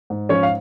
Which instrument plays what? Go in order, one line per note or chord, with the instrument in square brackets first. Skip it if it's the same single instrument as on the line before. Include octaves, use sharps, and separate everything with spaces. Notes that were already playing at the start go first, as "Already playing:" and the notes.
[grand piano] G#2
F3 C#4 C#5
F5